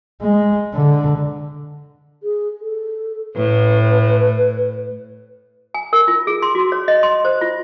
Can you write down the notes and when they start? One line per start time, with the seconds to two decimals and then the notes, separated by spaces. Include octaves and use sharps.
0.22 G#3
0.74 D3
2.23 G#4
2.61 A4
3.36 A2 B4
5.74 G#5
5.93 A#4
6.08 F4
6.27 G#4
6.42 C6
6.55 F#4
6.72 C#5
6.88 D#5
7.03 C6
7.25 C5
7.41 F4